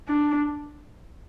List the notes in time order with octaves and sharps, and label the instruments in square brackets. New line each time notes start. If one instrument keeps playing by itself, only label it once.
[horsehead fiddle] D4